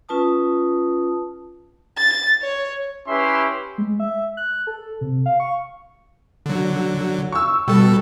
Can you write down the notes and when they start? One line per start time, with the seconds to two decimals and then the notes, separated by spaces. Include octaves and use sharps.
0.09 C#4 F4 B4 A5 D#6
1.98 A6
2.42 C#5
3.07 C#4 E4 G4 B4 E5 C6
3.78 G#3
4.00 E5
4.37 F#6
4.67 A4
5.01 C3
5.26 F5
5.40 C#6
6.46 D3 F#3
7.32 C#6 E6
7.68 B2 G3 A4